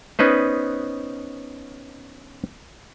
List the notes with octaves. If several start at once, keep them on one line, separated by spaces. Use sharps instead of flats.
B3 C#4 D#4 B4 C5